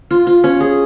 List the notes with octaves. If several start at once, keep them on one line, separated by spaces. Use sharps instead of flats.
F4
F4
C#4
G#4